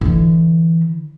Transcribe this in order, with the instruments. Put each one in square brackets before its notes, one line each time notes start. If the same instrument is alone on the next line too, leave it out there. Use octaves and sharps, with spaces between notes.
[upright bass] D3 E3